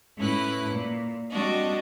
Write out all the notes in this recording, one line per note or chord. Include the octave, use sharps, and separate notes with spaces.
A2 C#4 E4 B4 F#6
A#2
G3 C4 D4 F#4 D#5